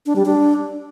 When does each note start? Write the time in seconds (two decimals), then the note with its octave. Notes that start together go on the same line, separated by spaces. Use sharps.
0.06 D4
0.16 G3
0.26 D4